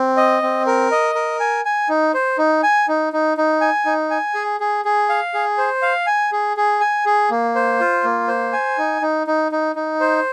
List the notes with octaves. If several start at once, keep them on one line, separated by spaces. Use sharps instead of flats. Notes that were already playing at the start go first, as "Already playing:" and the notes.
Already playing: C4
D#5
C4
A#4
D#5
A#4
G#5
G#5
D#4
C5
D#4
G#5
D#4
D#4
D#4
G#5
D#4
G#5
G#4
G#4
G#4
F5
G#4
C5
F5
G#5
G#4
G#4
G#5
G#4
A#3
C5
F4
A#3
C5
G#5
D#4
D#4
D#4
D#4
D#4
C5